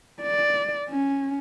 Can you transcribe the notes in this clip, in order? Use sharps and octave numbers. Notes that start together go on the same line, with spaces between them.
D5
C#4